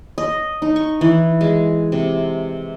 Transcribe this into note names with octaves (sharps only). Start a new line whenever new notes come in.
D#5
D#4
C#6
E3
G#3
C3